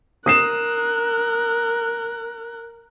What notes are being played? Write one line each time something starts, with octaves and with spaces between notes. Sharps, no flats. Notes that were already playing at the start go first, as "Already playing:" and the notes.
A#4 D#6 F#6 C7 E7